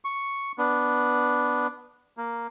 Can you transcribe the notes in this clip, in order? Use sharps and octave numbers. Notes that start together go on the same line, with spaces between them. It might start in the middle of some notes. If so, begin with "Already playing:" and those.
C#6
B3 D4
A#3